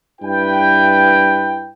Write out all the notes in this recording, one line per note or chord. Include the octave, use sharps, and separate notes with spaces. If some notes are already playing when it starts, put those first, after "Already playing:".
G2 E4 B4 G5